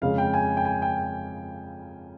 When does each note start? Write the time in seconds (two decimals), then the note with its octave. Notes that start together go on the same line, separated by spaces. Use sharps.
0.02 F2 C#3 G#3 F5
0.18 G5
0.34 G#5
0.57 G5
0.65 G#5
0.82 G5